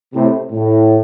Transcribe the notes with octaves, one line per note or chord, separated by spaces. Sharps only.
A2 C3
A2